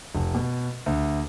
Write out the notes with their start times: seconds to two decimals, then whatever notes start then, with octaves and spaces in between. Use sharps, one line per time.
0.15 F1
0.35 B2
0.86 D2